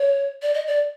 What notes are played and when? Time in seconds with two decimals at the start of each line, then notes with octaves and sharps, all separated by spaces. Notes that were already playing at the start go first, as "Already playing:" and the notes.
Already playing: C#5
0.42 D5
0.54 D#5
0.67 D5